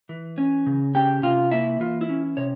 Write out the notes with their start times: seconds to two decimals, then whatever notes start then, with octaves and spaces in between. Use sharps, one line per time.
0.09 E3
0.38 C#4
0.66 C#3
0.95 C#4 G4 G5
1.23 C3 F4 F5
1.51 A#3 E4 E5
1.80 E3 F4
2.01 E4
2.09 C#4
2.37 C3 C#5